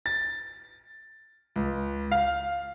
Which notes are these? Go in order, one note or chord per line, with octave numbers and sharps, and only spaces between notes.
A6
C#2
F5